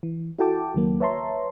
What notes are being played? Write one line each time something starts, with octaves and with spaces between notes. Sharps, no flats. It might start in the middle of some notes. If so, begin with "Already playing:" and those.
E3
E4 F#4 A4 G5 A5 D6
C#2 D#3 F#3 A#3
B4 C#5 E5 A5 A#5 C6